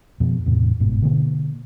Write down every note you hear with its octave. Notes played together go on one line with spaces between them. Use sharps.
F2 B2
E2 A2 C3
G1 G#2 B2
B2 D3 A#3